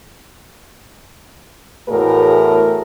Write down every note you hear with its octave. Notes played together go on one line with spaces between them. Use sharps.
E2 A2 A3 F#4 G#4 A#4